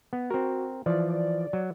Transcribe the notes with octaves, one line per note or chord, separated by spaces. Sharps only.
B3
C4 F#4 A#4
E3 F3 D5
F#3